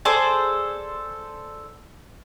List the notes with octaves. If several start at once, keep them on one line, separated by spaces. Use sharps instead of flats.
G#4 A4 C5 D5